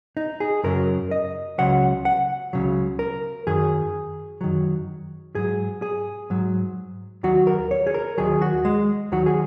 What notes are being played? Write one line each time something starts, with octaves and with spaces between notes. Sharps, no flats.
D#4
G#4
F#2 C#3 F#3 A#4
D#5
C#2 C#3 F#3 F#5
F#5
C#2 C#3 F#3
A#4
F#2 D#3 F#3 G#4
F#2 D#3 F#3
G#2 F#3 G#4
G#4
G#2 F#3
D#2 D#3 F#3 F#4
A#4
C#5
G#4
A#4
D#2 D#3 F#3 G#4
F#4
G#3
D#2 D#3 F#3 F#4
G#4